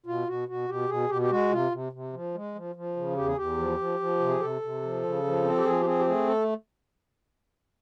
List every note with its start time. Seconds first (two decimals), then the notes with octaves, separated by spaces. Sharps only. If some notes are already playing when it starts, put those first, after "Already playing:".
0.06 B2 F4
0.28 B2 F#4
0.48 B2 F#4
0.68 B2 G4
0.89 B2 G#4
1.09 B2 G4
1.22 G4
1.30 G#3 F#4
1.51 C3 F4
1.71 C3
1.92 C3
2.13 F3
2.35 G#3
2.55 F3
2.75 F3
2.96 C#3
3.17 E2 G4
3.27 G#4
3.37 E2 G4
3.57 F3
3.78 F3
4.00 F3
4.20 C3
4.29 G#4
4.40 C3 A4
4.62 C3
4.82 F3
5.03 C#3
5.23 F3
5.44 C4
5.57 G4
5.64 F3 G#4
5.81 G4
5.85 C4 G#4
5.99 G4
6.06 A3 G#4
6.27 A4